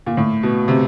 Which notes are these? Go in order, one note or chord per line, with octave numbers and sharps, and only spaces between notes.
A#2
A2
B2
C3